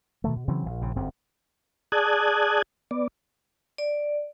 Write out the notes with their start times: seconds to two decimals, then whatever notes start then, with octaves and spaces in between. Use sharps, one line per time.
0.24 B2 D#3 A3
0.36 B2
0.48 C#3 E3 F#3 C4
0.66 A#1
0.81 A#1 C#3
0.96 G1 F#2 C4
1.92 G#4 D5 A5 D#6 F#6 G#6
2.91 B3 D5
3.78 D5